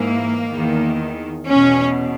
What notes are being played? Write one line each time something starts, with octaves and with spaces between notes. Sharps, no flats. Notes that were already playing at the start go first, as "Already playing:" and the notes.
Already playing: G#2 E3 A#3
E2 D#3
E2 B2 C#4